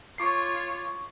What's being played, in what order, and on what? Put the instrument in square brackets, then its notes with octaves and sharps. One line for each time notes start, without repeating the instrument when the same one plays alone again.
[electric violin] F4 C#5 [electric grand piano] C#6 D6 C7